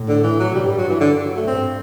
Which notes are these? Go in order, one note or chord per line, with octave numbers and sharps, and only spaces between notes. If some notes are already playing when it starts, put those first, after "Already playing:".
Already playing: A2
D3
E3
F#3
G2 G3
G3
F#3
E3
D3
F#3
A3
G2 C4